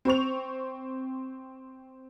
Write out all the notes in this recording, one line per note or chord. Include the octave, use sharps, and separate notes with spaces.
C4 C5 C#6 F7